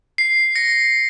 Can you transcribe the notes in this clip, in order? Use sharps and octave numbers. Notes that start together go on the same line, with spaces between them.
C7
A#6 C#7